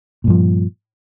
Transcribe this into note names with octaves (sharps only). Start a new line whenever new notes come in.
G2 A#2 F3